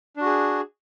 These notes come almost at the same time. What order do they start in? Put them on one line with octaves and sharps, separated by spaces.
D4 F#4 G#4